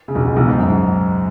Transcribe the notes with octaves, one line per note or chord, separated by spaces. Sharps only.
C#3
B1 B2
C#2 C#3
B1 B2
G#2
F#2
G#2